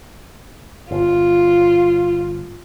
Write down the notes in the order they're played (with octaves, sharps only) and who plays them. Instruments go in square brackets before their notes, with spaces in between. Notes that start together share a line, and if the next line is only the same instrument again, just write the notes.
[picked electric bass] G1 [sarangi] F4